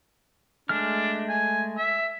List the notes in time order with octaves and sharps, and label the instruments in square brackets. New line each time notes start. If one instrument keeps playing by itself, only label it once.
[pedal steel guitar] G#3 A3 F6 [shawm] D4
[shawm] G#5
E5